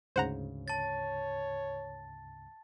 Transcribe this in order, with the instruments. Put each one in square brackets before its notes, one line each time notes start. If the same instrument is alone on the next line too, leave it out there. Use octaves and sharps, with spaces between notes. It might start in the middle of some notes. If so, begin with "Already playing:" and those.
[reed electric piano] D2 G#2 C#3 [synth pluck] C5 F#5 A#5
[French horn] C#5 [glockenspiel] A5 A6